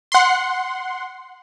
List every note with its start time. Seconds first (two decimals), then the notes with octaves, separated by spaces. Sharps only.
0.12 F#5 C6